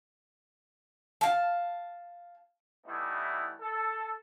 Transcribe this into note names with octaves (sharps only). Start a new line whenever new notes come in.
F5 A5
E3 G3 A3 B3 D#4 E4
A4